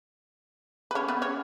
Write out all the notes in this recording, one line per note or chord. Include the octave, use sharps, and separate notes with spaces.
B4
C#4 C#5
B3 B4
C#4 C#5